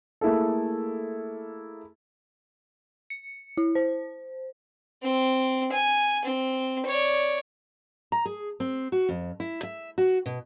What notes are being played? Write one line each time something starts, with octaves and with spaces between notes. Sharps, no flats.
A3 A#3 E4 G#4 A4
C#7
E4
C5
C4
G#5
C4
C#5 D5
A#5
G#4
C4
F#4
F2
E4
E5
F#4
B2